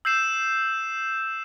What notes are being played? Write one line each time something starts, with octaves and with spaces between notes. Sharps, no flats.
E6 G6 C7 E7